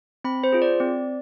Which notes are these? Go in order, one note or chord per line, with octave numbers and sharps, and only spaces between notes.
C4 B5
C5
F4 G#4
D5
C4